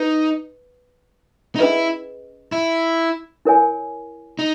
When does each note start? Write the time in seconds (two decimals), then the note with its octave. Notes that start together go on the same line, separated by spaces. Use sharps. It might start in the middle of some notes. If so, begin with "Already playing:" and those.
Already playing: D#4 B4
1.56 D#4
1.59 C#4 E4 G#4 B4 D#5
2.52 E4
3.45 E4 A#4 C#5 G#5
4.39 D#4